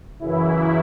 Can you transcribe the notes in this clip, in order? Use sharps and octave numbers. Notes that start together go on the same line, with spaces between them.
F#2 C#3 E3 E4